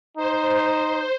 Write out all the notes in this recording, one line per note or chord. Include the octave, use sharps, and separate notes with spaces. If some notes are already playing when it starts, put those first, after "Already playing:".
D#4 C5